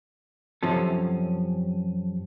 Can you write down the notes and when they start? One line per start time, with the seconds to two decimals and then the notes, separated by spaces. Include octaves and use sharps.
0.63 F#2 C3 F3 C#4 A4